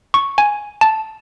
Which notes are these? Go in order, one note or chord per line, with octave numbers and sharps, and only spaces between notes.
C#6
G#5
A5